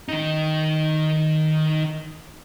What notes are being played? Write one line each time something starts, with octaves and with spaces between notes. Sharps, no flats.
D#3 D#4